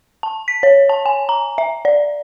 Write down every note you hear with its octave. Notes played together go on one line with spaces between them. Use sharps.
A5
B6
C#5
A5
G#5
A#5
E5
D5